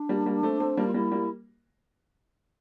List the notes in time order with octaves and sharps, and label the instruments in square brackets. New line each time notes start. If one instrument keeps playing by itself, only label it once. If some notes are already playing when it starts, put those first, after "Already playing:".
Already playing: [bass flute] D4
[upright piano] G3 A#3
G3 A#3
A3 C4
A3 C4
G3 A#3
[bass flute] F4
[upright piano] G3 A#3 [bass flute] E4
[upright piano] G3 A#3